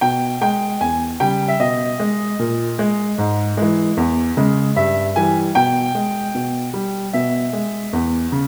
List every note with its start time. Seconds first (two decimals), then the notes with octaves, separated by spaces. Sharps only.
0.01 B2 G5
0.41 G#3 G5
0.81 E2 G#5
1.20 C#3 G3 G5
1.48 E5
1.60 B2 D#5
2.00 G#3
2.39 A#2
2.79 G#3
3.18 G#2
3.57 E3 G#3
3.97 E2
4.37 C#3 G#3
4.76 G2 E5
5.16 E3 G3 G#5
5.55 B2 G5
5.95 G#3
6.35 B2
6.74 G3
7.13 B2 E5
7.53 G#3
7.93 E2
8.32 C#3